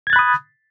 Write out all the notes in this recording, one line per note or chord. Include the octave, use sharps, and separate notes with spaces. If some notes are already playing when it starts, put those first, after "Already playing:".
B5 D#6 F#6 G#6 A6